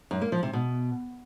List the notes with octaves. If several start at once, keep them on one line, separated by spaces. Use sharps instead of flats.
F#2
A#3
F3
C3
B2